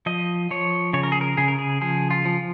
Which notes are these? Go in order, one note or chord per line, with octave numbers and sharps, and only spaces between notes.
F3 D#5
F3 C#5
C#3 C#5
A#4
G#4
A#4
C#3 G#4
A#4
G#4
F3 G#4
F4
F3